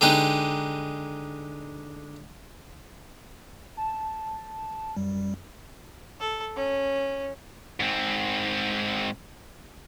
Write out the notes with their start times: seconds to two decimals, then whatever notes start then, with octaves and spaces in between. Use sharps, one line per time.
0.01 D3 G#3 D#4 G4 B4
3.77 A5
4.96 F#2 G3
6.20 A4
6.56 C#4
7.80 G#2 C4